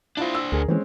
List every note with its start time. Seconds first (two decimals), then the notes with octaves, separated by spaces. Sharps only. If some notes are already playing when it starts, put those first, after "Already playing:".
0.17 D4 E4 F4 C5
0.34 E6
0.52 D2 G#4 A#4
0.69 E3 G#3 C4 C#4